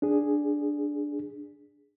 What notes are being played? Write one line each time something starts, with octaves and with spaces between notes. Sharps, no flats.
D4 G#4